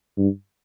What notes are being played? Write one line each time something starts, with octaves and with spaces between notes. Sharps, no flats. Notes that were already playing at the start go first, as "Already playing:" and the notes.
G2